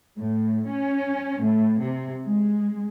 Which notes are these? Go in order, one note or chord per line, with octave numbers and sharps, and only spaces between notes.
A2
C#4
A2
C3
G#3